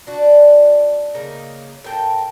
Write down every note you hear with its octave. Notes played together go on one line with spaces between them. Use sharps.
D4 F#4
C#3 A#3 D#4
A2 A#4 G5 A5